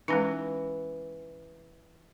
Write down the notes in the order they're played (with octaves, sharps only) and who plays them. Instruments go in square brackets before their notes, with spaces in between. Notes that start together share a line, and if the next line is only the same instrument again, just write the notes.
[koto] E3 [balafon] G#3 C#4 D#4